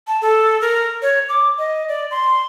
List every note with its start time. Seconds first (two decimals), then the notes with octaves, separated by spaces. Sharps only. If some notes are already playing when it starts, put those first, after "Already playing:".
0.07 A5
0.22 A4
0.61 A#4
1.02 C#5
1.29 D6
1.58 D#5
1.88 D5
2.11 C6